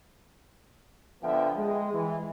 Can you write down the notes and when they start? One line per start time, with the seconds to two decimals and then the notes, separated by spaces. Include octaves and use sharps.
1.21 D3 F3 B3 E5 G5
1.56 G#3
1.93 E3